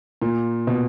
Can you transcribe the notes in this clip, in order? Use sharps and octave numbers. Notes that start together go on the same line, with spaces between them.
A#2
B2